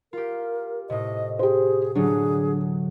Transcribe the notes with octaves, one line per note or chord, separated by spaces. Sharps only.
F4 G4 A#4
A2 C3 D#5
G4 G#4 C5
A2 D3 F#3 D4 G#4